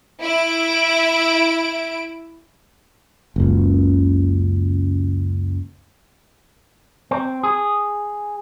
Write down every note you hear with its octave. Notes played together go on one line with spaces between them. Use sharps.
E4 D7
F#1 C#2
C4
G#4